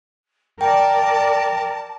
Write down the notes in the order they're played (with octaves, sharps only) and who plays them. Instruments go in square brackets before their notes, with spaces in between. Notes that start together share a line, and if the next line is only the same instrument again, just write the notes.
[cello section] A#4 D5 [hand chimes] G5 [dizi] A5